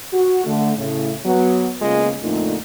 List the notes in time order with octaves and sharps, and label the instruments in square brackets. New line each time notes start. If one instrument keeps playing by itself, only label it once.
[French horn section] F#4
D3 A3
A2 C#3
F#3 B3
C#3 G#3 A#3 B3 F4
F2 A#2 D3 A3 D#4 F4